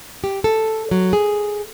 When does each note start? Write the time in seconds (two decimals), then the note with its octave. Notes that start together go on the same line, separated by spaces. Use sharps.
0.24 G4
0.44 A4
0.91 F#3
1.13 G#4